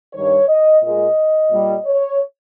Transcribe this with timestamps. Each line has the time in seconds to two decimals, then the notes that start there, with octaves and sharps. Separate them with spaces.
0.14 G2 D#3 G3 C#5
0.48 D#5
0.83 A#2 G#3 D#5
1.51 A#2 G3
1.85 C#5